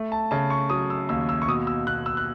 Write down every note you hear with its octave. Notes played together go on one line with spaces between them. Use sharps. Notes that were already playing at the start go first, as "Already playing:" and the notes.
Already playing: A3
A5
C#3 A5
C#6
F#3 D#6
E6
D#2 E6
E6
C#6
B2 D#6
E6
B2 F#6
E6
F#6